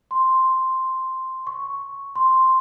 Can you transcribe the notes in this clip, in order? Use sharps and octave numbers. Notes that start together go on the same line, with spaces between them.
C6
C#6
C6